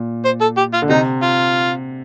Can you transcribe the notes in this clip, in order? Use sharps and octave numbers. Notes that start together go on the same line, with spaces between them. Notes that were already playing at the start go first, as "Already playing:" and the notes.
Already playing: A#2
C5
A4
G4
F4
D3
C3 D#4
F4